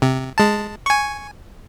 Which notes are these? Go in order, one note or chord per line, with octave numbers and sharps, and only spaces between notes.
C3
G#3 A5
G#5 C#6